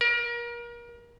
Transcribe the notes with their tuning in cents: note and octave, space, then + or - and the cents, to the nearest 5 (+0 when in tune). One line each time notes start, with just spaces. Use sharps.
A#4 +30